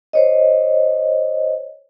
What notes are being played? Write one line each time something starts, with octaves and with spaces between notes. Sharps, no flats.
C5 C#5 D#5